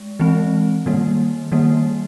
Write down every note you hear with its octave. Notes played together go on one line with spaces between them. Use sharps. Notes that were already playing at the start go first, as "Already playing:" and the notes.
Already playing: G#3
E3 G#3 C4
D#3 G3 A#3
D#3 G3 A#3